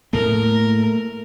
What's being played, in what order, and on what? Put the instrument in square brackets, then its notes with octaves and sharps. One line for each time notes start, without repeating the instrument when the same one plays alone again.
[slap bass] A2 A#3 [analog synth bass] A3 [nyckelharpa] A#4